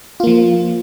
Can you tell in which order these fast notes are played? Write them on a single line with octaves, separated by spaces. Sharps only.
F4 A#3 F3